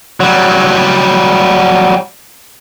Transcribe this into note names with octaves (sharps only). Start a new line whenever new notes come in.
F#3 G3